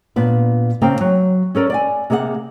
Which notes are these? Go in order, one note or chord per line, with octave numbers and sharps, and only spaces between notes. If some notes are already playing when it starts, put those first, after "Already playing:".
A#2 B3 D4
C#3 A#3 C4 A#4 G5
F#3
C#4 A4 A#4 D5
D5 F#5 G#5
C3 A#3 G#4 E5 F#5